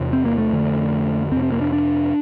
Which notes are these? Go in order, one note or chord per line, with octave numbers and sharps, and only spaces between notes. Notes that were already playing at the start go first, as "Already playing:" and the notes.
Already playing: E2 C3
C4
A#3
A3
F2 D3
F2 C3 C4
C4
A#3
D4
D4